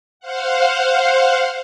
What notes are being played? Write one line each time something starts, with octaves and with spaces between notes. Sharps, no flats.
C5 F5 F#5